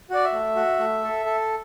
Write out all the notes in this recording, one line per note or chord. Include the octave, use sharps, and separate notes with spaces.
F#4 D5
E5
A3
F#4
A3
A4
A4